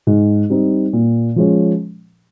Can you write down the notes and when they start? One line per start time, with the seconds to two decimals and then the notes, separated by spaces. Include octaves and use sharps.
0.07 G#2
0.50 G3 C4 D#4
0.93 A#2
1.36 F3 G#3 C#4